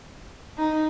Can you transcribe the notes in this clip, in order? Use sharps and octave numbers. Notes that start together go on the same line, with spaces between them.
D#4